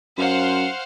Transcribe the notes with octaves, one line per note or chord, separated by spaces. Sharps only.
F#2 C5 F5 F#5